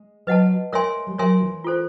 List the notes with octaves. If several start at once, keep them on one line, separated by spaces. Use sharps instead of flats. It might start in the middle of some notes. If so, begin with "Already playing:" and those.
Already playing: G#3
F#3 B4 D#5 F#5 A5
G#3 A#4 C#5 E5 G#5 C6
G3
F#3 A#4 C#5 E5 G#5 C6
E3
F4 A4 C5